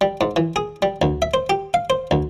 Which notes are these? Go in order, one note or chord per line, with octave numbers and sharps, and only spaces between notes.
G3
G#2
E3
G#4
G3
D2
E5
C5
G4
F5
C5
D2